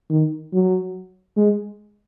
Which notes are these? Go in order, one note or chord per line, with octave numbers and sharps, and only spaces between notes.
D#3
F#3
G#3